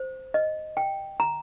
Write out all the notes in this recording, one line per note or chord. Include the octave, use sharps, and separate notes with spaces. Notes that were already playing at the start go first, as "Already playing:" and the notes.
Already playing: C5
D#5
G5
A#5